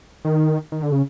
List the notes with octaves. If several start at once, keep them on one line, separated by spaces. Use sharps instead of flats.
D#3
D#3
D3
C#3